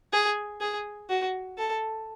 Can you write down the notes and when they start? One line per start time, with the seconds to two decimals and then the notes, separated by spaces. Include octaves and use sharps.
0.13 G#4
0.61 G#4
1.10 F#4
1.58 A4